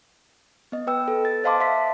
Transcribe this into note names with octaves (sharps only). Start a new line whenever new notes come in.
B3 D#5
B4 G5 E6
A4
A6
C5 D#5 F5 A5 C6 D6
E5 F5 C6 B6